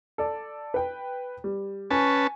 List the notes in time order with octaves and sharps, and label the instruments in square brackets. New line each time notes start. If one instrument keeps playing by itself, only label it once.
[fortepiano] A4 D5
B4 G5
G3
[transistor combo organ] C#4 B4 A5 [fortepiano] G#5 C#6